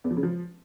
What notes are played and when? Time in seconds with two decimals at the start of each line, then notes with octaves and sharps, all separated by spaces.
0.04 E2
0.11 F3
0.17 C#3
0.23 F3